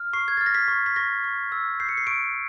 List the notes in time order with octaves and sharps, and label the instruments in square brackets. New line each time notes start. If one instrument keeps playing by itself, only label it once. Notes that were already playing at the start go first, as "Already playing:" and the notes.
Already playing: [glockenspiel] F6
C#6 C7
G#6
F6 A6
A#6
B6
C#6
B6
C#6 A#6
C#6
E6
G6 C7
C#7
C7
C#6 D7